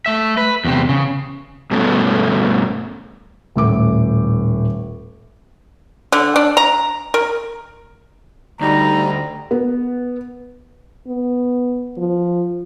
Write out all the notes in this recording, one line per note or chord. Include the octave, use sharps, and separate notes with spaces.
A3 E5
B4
E2 C3
C#3
G2 B2 A3 C#4
D#1 A2 D6
D3
D4
A#5
A#4
D2 G3 D#4 A#5
B3
B3
F3